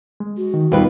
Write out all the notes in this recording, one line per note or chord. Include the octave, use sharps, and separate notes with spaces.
G#3
F#4
D#3
D#2 B2 G3 F4 B4